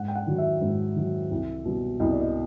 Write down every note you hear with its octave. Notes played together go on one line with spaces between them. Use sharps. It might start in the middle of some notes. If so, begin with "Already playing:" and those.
Already playing: G#2 F#5
G5
F#5
D#3 F#3
E5
G#2
D#3 F#3
C2
B2 G3
C2 D#5
D5
D#5